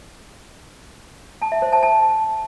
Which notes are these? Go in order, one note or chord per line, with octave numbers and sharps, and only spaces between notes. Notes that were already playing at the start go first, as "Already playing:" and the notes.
A5
E5
C5
A5
A5